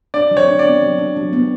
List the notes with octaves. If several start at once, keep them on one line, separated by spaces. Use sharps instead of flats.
D4 D5
F#3
C#5
D4
D5
B3
F#3
D4
F#3
B3